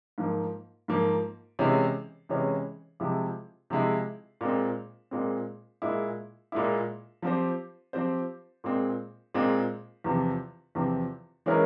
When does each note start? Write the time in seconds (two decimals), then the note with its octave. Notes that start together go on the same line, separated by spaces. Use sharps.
0.18 G#2 F3 A#3
0.88 G#2 F3 A#3
1.59 C3 E3 G#3 C#4 E4
2.29 C3 E3 G#3 C#4 E4
3.00 C3 F3 G#3 E4
3.70 C3 F3 G#3 E4
4.41 A#2 G#3 C4
5.11 A#2 G#3 C4
5.82 A#2 G#3 E4
6.52 A#2 G#3 E4
7.22 F3 C4 G4 C5
7.93 F3 C4 G4 C5
8.64 A#2 G#3 C4
9.34 A#2 G#3 C4
10.04 E2 C3 F3 C4
10.75 E2 C3 F3 C4
11.46 E3 G#3 C#4 E4 A#4